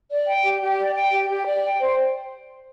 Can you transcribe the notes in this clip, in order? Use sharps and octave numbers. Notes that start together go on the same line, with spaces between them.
D5
G5
G4
G4
D5
G5
G4
G4
D5
G5
C5